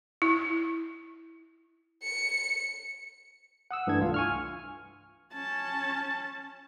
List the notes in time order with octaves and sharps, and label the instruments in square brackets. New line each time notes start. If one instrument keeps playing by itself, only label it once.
[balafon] E4
[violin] C#7
[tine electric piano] F#5 D#6 E6
G2 E3 A3 D4 G#6
C2 F4 F5
G#5 C#6 F6
[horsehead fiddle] C#4 A5